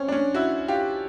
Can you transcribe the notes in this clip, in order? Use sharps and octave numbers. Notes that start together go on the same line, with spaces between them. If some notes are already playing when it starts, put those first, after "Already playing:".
Already playing: C4 C#4
D4
C#4
E4 F#4
F4 G4